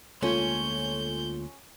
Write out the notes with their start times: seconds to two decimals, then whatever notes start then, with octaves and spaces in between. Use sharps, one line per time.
0.23 D2 G#3 A#3 C#4 F4 A4 C6 G6